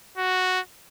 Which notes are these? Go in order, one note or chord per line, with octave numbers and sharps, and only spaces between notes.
F#4